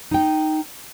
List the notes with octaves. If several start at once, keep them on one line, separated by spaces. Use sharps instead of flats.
D#4 G5